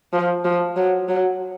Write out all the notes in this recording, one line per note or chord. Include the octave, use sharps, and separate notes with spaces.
F3
F3
F#3
F#3